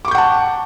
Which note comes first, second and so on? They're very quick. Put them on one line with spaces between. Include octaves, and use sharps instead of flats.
D6 C#6 G6 F#5 A5